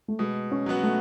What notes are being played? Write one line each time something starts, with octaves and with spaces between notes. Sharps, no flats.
A3
B2 G#3
C#4
F#3 B3 F#4
A3